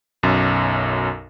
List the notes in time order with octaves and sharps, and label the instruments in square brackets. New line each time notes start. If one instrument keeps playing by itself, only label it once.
[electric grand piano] B1 F#2